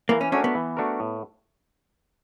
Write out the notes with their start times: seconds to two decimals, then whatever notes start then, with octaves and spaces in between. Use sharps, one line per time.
0.09 E3 A#3
0.21 C#4
0.32 A3 C#4 D4 F#4 A#4
0.44 B3
0.55 E3
0.77 A3 D4 F#4 A#4
1.00 A2